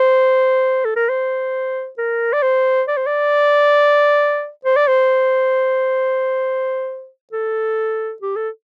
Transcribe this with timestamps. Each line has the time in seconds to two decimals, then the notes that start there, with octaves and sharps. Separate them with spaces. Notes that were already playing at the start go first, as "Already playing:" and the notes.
Already playing: C5
0.85 A4
0.96 A#4
1.09 C5
1.98 A#4
2.33 D5
2.43 C5
2.88 D5
2.97 C5
3.07 D5
4.65 C5
4.76 D5
4.88 C5
7.33 A4
8.22 G4
8.36 A4